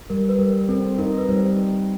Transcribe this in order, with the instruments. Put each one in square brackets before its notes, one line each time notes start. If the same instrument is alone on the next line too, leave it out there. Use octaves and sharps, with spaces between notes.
[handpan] G3 [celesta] A#4
[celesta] B4
[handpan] G3 [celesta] A#4
[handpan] C4 [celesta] A4
[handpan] D#4 [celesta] A#4
[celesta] B4
[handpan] G3 [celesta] C5